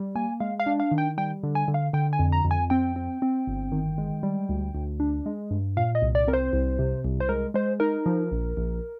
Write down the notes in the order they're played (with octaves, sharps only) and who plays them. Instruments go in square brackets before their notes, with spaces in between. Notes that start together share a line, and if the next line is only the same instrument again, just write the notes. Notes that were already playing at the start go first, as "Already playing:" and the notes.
Already playing: [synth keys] G3
A#3 G#5
G#3 F5
F5
D4
F5
D#3
G5
G3 G5
D3
G#5
D3
F5
D3 G5
G#5
F2
A#5
F2
G#5
C4 G5
C4
C4
G1
D#3
G#3
G3
D2
D2
D4
G#3
G2
A#2 F5
D#5
C2
D5
C4 A#4
C5
C2
C3
C2
C5
G#3 A#4
G#3 C5
D#4 A#4
F3
A#1
A#1